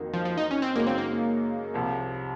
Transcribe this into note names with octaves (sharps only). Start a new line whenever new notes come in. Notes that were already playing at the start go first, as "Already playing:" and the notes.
Already playing: F2 D#3 A#3 D#4 F#4
F3
F3
D#4
C#4
C4
F#2 C#3 G#3 A#3 D#4 F#4
C4
A#3
C2 C3 F3